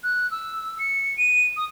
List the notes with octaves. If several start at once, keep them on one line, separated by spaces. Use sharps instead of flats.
F#6
E6
C#7
D#7
D#6